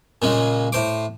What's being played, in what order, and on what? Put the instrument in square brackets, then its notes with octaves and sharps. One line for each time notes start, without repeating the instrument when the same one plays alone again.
[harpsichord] A#2 C#3 G#3
A2 C5 D6